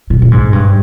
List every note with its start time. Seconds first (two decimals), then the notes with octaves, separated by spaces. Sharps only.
0.10 A#2
0.22 A#2
0.31 G#2
0.53 G2